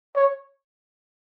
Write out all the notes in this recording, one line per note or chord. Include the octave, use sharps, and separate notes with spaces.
C#5